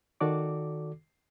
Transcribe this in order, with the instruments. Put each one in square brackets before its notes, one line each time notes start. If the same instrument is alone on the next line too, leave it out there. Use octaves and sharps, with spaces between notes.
[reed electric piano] D#3 F#4 A4 D5 D6